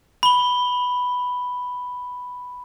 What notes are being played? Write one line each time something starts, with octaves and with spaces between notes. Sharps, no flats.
B5 G7